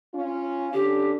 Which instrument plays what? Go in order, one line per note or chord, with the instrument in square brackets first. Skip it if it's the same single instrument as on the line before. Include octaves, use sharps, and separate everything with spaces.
[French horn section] C#4 F4
[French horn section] D3 C#4 [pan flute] G4